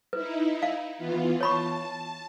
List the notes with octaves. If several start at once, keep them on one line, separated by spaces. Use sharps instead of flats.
D#4 E4 B4
F5
E3 B3 F4
C#5 A5 B5 C#6